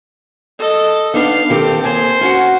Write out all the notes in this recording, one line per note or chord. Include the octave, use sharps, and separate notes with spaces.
A4 D#5
B3 D4 D#4 F5
D#3 C4 G4 A4
D#2 C5 G#5
C#4 F#4 F#5